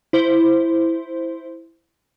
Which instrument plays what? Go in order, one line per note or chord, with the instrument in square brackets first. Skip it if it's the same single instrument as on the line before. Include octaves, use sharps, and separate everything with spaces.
[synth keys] E4 C5